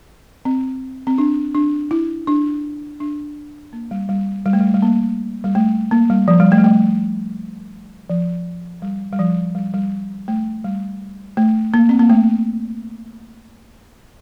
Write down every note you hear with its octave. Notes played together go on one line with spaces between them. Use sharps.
C4
C4
D4
D4
E4
D4
D4
A#3
G3
G3
G3
A3
G3
A3
G3
A#3
G3
A3
A#3
G3
F3
G3
A3
G3
A3
F3
G3
G3
F3
G3
G3
A3
G3
A3
A#3
C4
A#3
A3